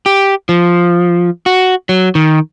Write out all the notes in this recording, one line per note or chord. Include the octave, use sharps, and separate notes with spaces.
G4
F3
F#4
F#3
D#3